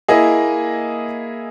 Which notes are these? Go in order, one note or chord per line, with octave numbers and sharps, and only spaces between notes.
A#3 E4 G#4 D#5